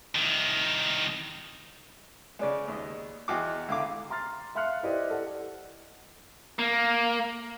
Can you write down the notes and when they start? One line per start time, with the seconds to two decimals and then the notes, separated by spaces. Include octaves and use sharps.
0.16 C2 D#3
2.39 C#3 G#3 B4 D5
2.68 D#2 D#5
3.28 E2 F#4 G4 D#5 F#5 D6
3.68 C#2 D3 E4 F5 D6
4.10 A#5 C6 F6 A6
4.55 E5 F5 C6 F6 F#6 C#7
4.83 E4 G4 B4 C5 D5 D#5
5.10 A4 D5 F#5
6.59 A#3